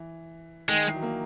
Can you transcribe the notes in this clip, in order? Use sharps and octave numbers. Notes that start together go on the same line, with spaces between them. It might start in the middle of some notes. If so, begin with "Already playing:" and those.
Already playing: E3
D#3 G#3
E3
F#3
A#3